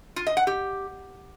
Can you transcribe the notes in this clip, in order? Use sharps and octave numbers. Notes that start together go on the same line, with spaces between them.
F4
D#5
F#5
G4